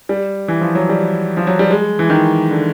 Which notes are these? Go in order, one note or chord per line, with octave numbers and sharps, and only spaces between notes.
G3
E3
F3
F#3
G3
F3
F#3
G3
G#3
E3
D#3
D3